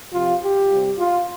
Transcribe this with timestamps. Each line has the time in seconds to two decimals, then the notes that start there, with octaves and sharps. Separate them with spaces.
0.13 C3 F3 F4
0.41 G4
0.70 C3 G3
0.98 F4